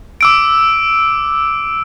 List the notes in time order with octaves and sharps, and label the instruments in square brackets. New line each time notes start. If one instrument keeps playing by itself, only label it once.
[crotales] D6 E6 D7